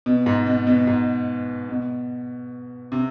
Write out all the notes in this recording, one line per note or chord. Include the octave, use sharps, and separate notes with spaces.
B2
G#2
B2
B2
G#2
B2
C3